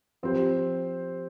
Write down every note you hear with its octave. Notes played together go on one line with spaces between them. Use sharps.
F3 C4 G4 C5